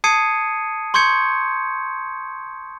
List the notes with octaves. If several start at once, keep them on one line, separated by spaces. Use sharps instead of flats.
A5 D#6 G#6 C7 C#7 D#7
C6 C#6 G6 G#6 C#7